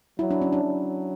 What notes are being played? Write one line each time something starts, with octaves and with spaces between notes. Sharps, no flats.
F#3 E4
D4
C#4
D4
F#3